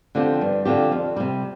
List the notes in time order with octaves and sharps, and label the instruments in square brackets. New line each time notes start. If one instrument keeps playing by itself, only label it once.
[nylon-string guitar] D3 F3 C4 G4
G2
D3 F3 C4 G4
F2
C3 G3